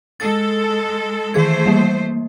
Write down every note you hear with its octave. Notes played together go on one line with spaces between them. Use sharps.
G#3 A4 A6
D#3 E3 A3 G#4 C5 G#6
G3 A#3